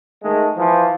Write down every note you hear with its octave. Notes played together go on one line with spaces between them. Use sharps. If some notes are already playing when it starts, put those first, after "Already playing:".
D#3 G#3 A3
E3 F3